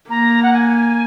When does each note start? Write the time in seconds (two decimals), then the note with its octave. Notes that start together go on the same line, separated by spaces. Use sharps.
0.09 A#3 A#5
0.42 F#5
0.53 G#5